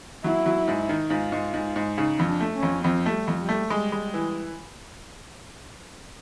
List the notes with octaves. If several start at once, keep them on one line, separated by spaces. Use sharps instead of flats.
F#3 E4
F#3
G#2
D#3
G#2 F4
G#2
G#2
G#2
C#3 D#4
F2
D4
A3
C#4
F2
F2 C4
A3
G3
F2
G3
A3
G3 G#3
G#3
E3